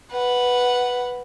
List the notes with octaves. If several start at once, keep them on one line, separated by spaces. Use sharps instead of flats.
B4 F#5